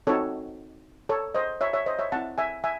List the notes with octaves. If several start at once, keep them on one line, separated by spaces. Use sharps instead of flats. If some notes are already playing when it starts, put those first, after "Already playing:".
C4 D#4 F#4 A4 C#5
A4 C#5
C5 D#5
C#5 E5
C#5 E5
C5 D#5
C#5 E5
C4 E4 F#5 A5
E5 G#5
E5 G#5